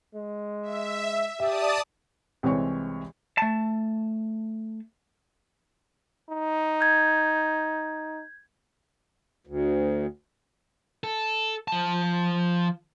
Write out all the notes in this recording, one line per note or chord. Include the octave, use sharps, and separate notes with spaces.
G#3
E5
G4 D5 E5 A5 D#6
C2 E3 G#3 C4 C#5 C#6
A3 A5
D#4
G6 G#6
D2
A4
F3 A5